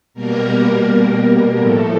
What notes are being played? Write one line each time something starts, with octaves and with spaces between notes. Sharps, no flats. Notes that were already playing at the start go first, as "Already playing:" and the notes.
B2 G3 A#3 A#4
A2 F3 A3 A4